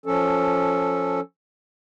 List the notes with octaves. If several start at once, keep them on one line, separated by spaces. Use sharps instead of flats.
F3 C#4 A4